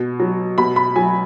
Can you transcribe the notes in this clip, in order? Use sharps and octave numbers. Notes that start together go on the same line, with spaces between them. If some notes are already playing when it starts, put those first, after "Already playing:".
Already playing: B2
F#3
B2 B5
B5
F#3 G#5